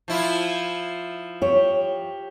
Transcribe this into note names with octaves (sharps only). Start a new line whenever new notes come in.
F3 E4 F4
G4 C#5